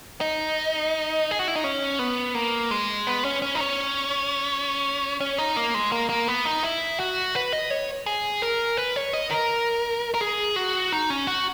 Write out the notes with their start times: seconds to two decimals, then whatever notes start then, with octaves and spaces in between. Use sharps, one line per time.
0.21 D#4
1.31 G#4
1.39 F#4
1.48 E4
1.56 D#4
1.64 C#4
1.99 B3
2.35 A#3
2.71 G#3
3.07 B3
3.25 C#4
3.42 C#4
3.55 D#4
3.60 C#4
5.20 C#4
5.38 D#4
5.56 A#3
5.74 G#3
5.92 A#3
6.09 A#3
6.28 B3
6.45 D#4
6.63 E4
6.99 F#4
7.35 B4
7.53 D#5
7.70 C#5
8.06 G#4
8.42 A#4
8.77 B4
8.96 C#5
9.13 D#5
9.31 A#4
10.14 A#4
10.21 G#4
10.56 F#4
10.93 D#4
11.10 C#4
11.27 F#4